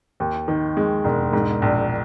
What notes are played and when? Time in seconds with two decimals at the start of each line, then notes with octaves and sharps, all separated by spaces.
0.20 D#2
0.48 D#3
0.77 G#3
1.05 E1
1.33 G#2
1.62 A#1